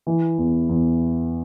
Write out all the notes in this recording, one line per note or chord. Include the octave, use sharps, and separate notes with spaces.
E3
E2
E2